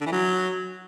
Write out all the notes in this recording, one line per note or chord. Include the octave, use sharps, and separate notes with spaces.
D3
E3
F#3